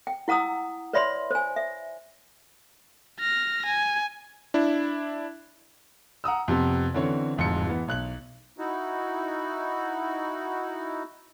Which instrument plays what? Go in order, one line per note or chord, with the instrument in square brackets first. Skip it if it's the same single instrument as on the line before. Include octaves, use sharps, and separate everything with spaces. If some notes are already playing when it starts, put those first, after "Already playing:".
[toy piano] G5
E4 F#5 A#5 D#6 E6
B4 C#5 D5 E5 B5 C6
C5 G#5
E5
[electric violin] F6 A#6
G#5
[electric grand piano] D4 E4
[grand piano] F#5 A#5 D#6 E6
F2 C3 B3
D3 E3 C4 C#4 C#5
D1 F2 G#2 C#7
E3 B3
B1 F#6 F#7
[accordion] D#4 E4 F#4